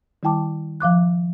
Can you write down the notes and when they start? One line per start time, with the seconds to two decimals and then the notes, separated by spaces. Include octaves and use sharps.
0.23 D#3 G3 E4 G5 A5 D6
0.80 F3 F5 D6 F#6